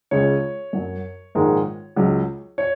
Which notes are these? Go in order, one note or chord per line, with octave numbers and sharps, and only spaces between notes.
C#2 C#3 G#3 C#5
F#2 F#3
A#1 G#2 D#3 G#3
C#2 C#3 F#3
C#5